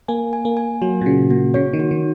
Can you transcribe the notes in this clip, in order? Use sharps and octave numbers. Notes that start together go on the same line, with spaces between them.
A#3 G#5
G#5
A#3
G#5
F#3 F#4
A#2
C#3 F#4
A#2 F#4
C#3 C#5
D#3
F#4
D#3